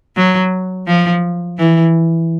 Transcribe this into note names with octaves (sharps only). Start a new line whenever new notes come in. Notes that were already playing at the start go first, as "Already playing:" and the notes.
F#3
F3
E3